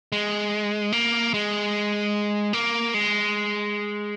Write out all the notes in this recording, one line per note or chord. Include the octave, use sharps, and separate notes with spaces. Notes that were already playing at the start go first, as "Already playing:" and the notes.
G#3
A#3
G#3
A#3
G#3